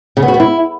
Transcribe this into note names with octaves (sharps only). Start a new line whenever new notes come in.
C#3
B3
F#4
B3
E4